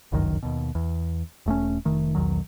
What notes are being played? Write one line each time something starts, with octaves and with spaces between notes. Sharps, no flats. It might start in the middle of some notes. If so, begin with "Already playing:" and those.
G1 C#2 F#2 D#3
D#2 B2
E2
E1 A3 A#3 C#4
F1 D#3 A3
B1 E2 D#3 F#3